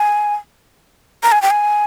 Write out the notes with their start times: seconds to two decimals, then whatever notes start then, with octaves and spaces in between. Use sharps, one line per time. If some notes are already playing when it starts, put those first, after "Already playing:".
Already playing: G#5
1.23 A#5
1.32 G#5
1.42 G5
1.51 G#5